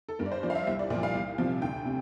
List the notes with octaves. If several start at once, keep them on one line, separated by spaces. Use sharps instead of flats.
A4
G2 A#4
D5
C5
F3 D5
F5
E5
C2 E5
D5
A#2 F3 D5
F5
C2
C3 F3
D2 G5
C3